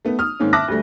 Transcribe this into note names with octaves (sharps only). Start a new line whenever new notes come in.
A3 B3
D#6 F6
G#2 D#3 A#3 C4 C#4
E5 A5 D6 F#6 A#6
D2 G3 A3